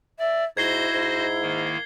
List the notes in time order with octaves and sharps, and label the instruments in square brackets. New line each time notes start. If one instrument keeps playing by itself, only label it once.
[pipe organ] D5 [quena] E5
[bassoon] G#2 [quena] E4 [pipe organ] F#4 C5 D#5 [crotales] G#6 C7 G7
[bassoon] G#2
[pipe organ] D#3 A#3